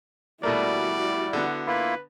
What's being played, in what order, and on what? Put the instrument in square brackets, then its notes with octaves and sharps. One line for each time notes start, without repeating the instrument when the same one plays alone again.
[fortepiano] B2 A3 A#3 [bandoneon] G3 [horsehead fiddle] E4 F#4 [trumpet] D5
[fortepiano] D3 B3
[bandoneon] A#3 E4 F4 [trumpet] B4